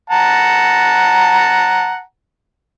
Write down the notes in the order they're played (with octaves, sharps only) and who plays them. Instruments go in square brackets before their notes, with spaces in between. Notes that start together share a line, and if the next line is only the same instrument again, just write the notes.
[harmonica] F#5 A5 A#5